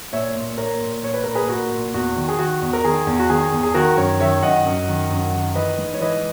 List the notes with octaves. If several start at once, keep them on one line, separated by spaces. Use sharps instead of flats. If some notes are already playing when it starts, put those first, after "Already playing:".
A#2 C#5 E5
A#2
A#2 A#4 C#5
A#2
A#2 C#5
B4
A#2 A#4
G#4 B4
A#2 F#4 A#4
A#2
E2 F#4
D#3
G#4
D#3 F#4
E2
A#4
D#3 G#4
E2
F#4
D#3 G#4
E2
G#4
D#3 F#4 A#4
F#2 A#4 C#5
D#3 C#5 E5
F#2 D#5 F#5
F#2
D#3
F#2
D#3
E3 B4 D#5
G#2
C#5
E3 B4 D#5